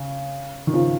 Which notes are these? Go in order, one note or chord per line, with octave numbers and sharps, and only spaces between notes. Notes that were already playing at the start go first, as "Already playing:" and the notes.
Already playing: C#3
D#3
C#3 F3